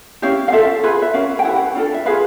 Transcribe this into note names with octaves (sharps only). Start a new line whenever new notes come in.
C#4 E4 G4 F5
F5
F4 A4 E5
F4 G#4 B4
E5
C#4 F#4 A#4 F5
G5
E4 G4 B4 F#5
D4 F4 A4
E5
F4 G#4 B4 F5